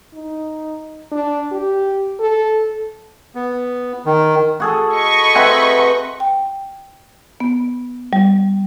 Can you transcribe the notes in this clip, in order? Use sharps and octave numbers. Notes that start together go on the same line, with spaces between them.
D#4
D4
G4
A4
B3
D#3
F#4 G#4 A4
D#5 B5 C#6
C4 B4 E5 F#5 G#5
G5
B3
G3